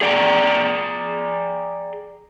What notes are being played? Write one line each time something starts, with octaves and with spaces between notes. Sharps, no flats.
G#4 D5 F#5 G5 A#5